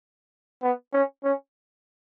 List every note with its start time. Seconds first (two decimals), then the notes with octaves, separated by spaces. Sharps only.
0.63 B3
0.93 C#4
1.24 C#4